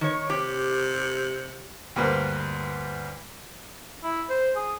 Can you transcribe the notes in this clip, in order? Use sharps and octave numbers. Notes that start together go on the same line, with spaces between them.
D#3 C#5
C3 G4
D2 G2 A#3 B4 C5
E4
C5
G#4